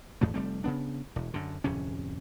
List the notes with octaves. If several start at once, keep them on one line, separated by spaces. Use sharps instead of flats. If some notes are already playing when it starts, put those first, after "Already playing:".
G#1 E2 A2 A3
F1 G3 A3 C4
C#3 B3 D4
E1
F#2 D3
D1 F2 C3 C#4